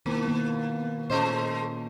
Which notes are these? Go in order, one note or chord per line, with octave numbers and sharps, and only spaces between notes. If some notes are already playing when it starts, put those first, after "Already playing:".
B2 D#3 A#3 E4
D#3 A#3 B3
A#2 G#3 A3 C#4 C5 D#5